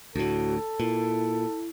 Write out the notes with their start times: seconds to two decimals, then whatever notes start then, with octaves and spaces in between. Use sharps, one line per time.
0.16 D2 A2 F#4 A4
0.80 A#2 E4